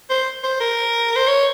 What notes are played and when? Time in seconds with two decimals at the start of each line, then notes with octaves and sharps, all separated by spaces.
0.10 C5
0.44 C5
0.61 A#4
1.16 C5
1.28 C#5